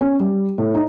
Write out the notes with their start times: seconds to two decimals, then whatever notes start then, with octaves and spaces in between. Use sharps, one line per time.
0.01 C#4
0.20 G3
0.58 A2
0.74 D#4